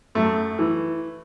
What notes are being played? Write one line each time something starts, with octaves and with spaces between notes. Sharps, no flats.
F#2 A3
E3